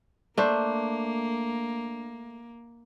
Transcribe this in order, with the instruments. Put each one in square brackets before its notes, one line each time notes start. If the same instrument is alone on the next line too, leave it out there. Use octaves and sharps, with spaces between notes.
[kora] A3 D4 C5 [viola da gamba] A#3